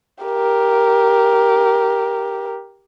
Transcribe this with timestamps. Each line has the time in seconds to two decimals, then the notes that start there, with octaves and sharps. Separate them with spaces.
0.24 G4 A#4